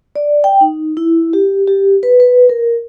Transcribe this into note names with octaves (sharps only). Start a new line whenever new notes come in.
D5
G5
D#4
E4
G4
G4
B4
B4
A#4